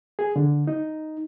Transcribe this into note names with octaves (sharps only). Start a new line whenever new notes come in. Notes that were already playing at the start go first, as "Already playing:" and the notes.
G#4
D3
D#4